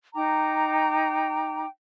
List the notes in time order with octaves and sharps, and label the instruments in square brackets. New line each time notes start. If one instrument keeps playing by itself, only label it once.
[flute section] D#4 G5 A#5 D6